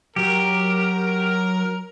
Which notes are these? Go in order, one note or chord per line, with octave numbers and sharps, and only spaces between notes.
F#3 G4 A#4